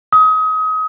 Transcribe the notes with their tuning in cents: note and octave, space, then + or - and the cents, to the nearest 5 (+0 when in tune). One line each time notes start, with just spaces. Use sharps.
D#6 +30